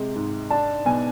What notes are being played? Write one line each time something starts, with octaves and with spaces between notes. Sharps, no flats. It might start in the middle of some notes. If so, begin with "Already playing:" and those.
Already playing: C3 G#3
G#2
D4 A5
B2 G#5